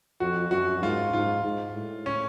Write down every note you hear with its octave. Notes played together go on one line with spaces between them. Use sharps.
F2 F#4
F#2 F#4
G#2 F4
G#2 F4
G#2
A2
C#4